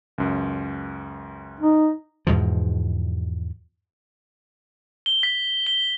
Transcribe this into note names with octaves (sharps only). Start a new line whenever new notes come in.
C#2 F#2
D#4
E2 G#2 B2 F3
G7
B6
G7